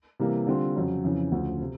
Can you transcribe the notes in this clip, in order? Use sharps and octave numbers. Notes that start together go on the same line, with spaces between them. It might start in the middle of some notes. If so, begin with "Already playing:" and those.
C3 E3 G3 A#3
D3 G3 C4 F4
F2 C#3 F#3
F2 C#3 E3
D2 C#3 F3
C3